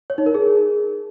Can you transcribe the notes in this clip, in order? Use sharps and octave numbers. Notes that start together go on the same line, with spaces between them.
C#5
D#4
A#4
G#4